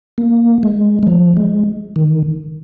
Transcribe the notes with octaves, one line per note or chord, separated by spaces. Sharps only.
A#3
G#3
G#3
F3
G#3
D#3